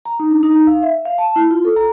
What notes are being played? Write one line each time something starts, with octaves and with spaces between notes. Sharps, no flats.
A#5
D#4
D4
D#4
F5
E5
F5
A5
E4
F4
A4
A#5